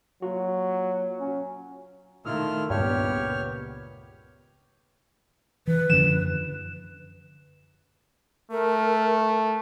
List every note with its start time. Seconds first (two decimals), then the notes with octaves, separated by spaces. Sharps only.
0.22 F#3 A#3 F4 F#4
1.20 C#4
2.26 D#3 A3 E4 F4 F6
2.70 C#2 G2 A#2 B3 G4 C#5 F6
5.67 E3 B4
5.90 F#2 D3 F3 E7
8.51 A3 A#4